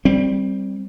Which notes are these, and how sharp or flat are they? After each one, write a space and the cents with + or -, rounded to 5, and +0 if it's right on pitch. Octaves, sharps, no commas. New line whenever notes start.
G3 +0 C4 +15